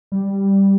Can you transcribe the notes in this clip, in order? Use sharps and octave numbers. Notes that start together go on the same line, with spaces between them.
G3